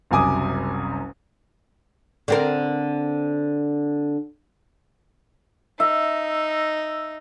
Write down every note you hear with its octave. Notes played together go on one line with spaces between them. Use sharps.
F#1 C2 F#2 G#5 D6 D#6
D3 C4 A#4
D#4 E5